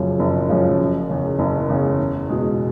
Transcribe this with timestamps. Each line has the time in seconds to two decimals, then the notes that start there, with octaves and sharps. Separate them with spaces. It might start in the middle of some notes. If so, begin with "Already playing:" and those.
Already playing: F#1 F#2 C#3 F3
0.19 F#1
0.49 F#2 C#3 F3
0.79 F#1
1.09 E2 C#3
1.39 F#1
1.69 E2 C#3
1.99 E2
2.29 B2 G#3